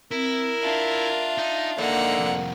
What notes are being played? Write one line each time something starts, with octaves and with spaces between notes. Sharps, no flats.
C4 E4 A#4
D4 F4 E5
D#4
D3 F3 A#3 D#4 F#5
C2 F2